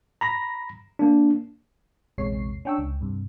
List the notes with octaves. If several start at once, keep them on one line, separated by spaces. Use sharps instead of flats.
A#5 B5 A#6
A#3 D4
A#1 E2 C3 G#3 C#5 C7
C#4 D4 G5 C#6 E6
C#2
G2 C3